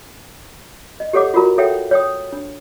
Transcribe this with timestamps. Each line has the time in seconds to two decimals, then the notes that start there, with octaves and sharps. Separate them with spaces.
1.00 D#5
1.13 G4 A4 C#5 F#5 D6
1.34 F4 F#4 A#4 A#5
1.58 A4 C#5 E5 F#5 G5
1.91 C#5 G5 D#6
2.32 D4